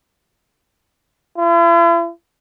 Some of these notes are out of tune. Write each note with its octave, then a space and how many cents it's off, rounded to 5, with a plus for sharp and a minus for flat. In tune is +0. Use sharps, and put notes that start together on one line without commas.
E4 +45